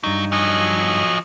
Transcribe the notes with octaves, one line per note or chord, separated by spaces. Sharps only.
G2 F#3 D#4
F3 F#3 D#5 G#5 C#6